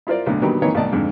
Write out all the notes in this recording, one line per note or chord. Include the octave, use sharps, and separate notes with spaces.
E4 F4 A#4 C5 D5
B1 A2 D3
A#2 D3 D#3 F#3 G3 B3
D#3 E3 A#3 D#4 B4 C#5
B1 A2 D#3 D#4 D5 A5
F2 G#2 D3